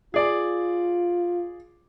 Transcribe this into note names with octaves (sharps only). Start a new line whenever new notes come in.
F4 G#4 D5